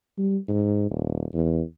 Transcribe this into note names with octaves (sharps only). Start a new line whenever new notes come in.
G3
G#2
D#1
E2